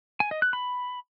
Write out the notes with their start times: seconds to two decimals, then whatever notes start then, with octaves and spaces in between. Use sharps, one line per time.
0.20 G#5
0.31 D#5
0.42 F#6
0.53 B5